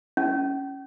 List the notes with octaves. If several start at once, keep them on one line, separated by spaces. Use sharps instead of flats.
C#4